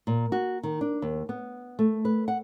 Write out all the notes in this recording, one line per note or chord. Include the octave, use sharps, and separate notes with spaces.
A#2
F#4
D#3
D4
D#2
B3
A3
B4
F#5